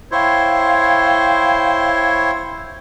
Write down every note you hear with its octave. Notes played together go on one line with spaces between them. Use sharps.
E4 C5 C#5 F5 G5